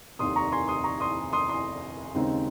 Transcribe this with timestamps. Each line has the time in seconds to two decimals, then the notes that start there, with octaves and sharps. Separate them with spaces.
0.19 F1 D#2 D#3 C6 D#6
0.36 A#5 C#6
0.52 G#5 C6
0.68 C6 D#6
0.84 A#5 C#6
1.00 C6 D#6
1.33 C6 D#6
1.49 C6 D#6
2.14 D#2 C#3 G#3 C4 D#4